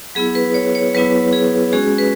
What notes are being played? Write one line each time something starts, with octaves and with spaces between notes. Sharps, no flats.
F#3 B3 E4 G#4
B4
C#5
C#5
F#3 B3 E4 B4
G#4
G#3 C#4 F#4 G#4
B4